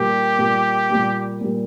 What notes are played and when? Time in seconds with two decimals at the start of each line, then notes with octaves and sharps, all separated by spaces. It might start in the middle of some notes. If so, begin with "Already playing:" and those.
Already playing: A#2 G3 A#3 G4
0.39 A#2 G3 A#3
0.90 A#2 G3 A#3
1.41 A#2 G3 A#3